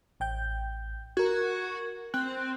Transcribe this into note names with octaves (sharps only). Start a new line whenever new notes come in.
A1 G5 G6
F#4 A#4 G#6
C4 F#6